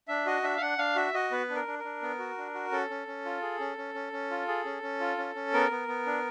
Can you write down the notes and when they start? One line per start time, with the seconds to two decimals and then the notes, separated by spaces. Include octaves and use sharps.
0.08 D4 E5
0.26 F#4 D#5
0.43 D4 E5
0.57 F5
0.61 D4 F#5
0.78 D4 F5
0.96 F#4 E5
1.14 F#4 D#5
1.31 B3 B4
1.49 D4
1.55 A#4
1.67 D4
1.79 D4 A#4
2.02 B3
2.19 F#4
2.37 D4
2.54 F#4
2.71 C#4 A4
2.90 C#4
3.07 C#4
3.25 F4
3.42 G#4
3.60 C#4
3.78 C#4
3.94 C#4
4.12 C#4
4.31 F4
4.48 G#4
4.65 C#4
4.82 C#4
5.00 F4
5.18 C#4
5.35 C#4
5.53 B3 A#4
5.71 B3
5.88 B3
6.06 D4